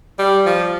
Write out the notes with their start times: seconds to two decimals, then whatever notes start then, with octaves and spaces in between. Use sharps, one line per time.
0.19 G3
0.46 F3